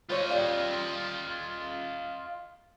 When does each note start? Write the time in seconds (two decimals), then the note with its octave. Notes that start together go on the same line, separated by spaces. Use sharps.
0.10 F4 C5 C#5 D#5 F5
0.30 G4 D5 F5